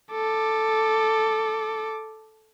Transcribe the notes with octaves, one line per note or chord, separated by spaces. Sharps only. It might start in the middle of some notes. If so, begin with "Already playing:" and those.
A4 D6